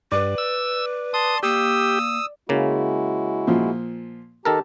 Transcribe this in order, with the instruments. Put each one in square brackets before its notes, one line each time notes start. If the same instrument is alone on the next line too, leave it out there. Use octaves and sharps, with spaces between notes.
[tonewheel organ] G2 [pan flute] B4 [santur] D5
[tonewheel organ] E6
[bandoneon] A5 C6 [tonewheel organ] D#6
[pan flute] A#3 [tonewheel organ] G4 [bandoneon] D#6 E6
[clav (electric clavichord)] C#3 A#3 [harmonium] G#3 E4 F#4
[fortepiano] A#2 F3
[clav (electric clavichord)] D#3 A4 A#4 [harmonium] G4 A5